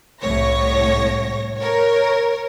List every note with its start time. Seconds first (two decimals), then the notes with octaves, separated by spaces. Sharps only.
0.20 C2 A2 C#5 A#6
1.58 A#4 C#5